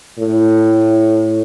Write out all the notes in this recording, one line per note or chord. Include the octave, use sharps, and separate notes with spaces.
A2